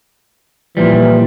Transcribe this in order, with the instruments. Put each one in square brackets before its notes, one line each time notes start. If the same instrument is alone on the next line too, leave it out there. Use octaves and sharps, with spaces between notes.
[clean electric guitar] A#2 F3 G3 [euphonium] E3